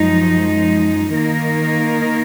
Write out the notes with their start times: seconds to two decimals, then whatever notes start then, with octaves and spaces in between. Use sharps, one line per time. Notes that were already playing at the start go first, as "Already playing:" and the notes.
Already playing: F#2 F3 G#3 D#4
1.11 D#3 A#3 D#4 A#4